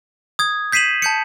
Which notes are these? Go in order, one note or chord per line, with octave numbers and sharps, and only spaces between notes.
D#6 G#6
G6 B6 C7 D#7 E7 F#7
A5 G6 C#7